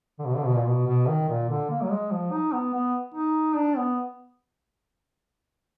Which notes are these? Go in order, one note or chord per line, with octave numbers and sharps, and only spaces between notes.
D3
B2
D3
B2
A#2
B2
B2
D#3
A#2
D3
A#3
F#3
G#3
F3
D#4
B3
B3
D#4
D4
B3